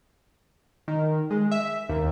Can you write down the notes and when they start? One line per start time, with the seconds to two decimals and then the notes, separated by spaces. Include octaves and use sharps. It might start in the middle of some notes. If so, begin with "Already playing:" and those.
0.88 D#3
1.31 G#3
1.51 E5
1.89 D#2